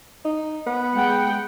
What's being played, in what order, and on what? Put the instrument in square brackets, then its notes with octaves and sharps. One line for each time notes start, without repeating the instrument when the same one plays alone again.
[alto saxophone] D#4
B3
[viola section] G#3 F#5 G5